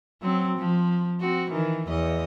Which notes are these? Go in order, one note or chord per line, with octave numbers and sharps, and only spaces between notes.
F#3 C4
F3
C4 F#4
D#3 E3
E2 D#5